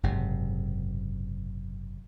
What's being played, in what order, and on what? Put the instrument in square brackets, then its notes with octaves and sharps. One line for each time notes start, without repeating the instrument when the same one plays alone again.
[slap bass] F#1 G#2 C3